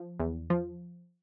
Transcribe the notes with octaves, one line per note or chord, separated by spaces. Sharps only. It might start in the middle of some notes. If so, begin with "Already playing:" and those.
Already playing: F3
E2
F3